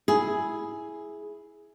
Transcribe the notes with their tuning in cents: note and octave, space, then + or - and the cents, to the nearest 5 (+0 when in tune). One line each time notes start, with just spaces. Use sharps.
E4 -5 G#4 +5